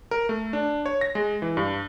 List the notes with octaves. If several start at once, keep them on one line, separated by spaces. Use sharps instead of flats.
A#4
A3
D4
C#5
A#6
G#3
E3
G2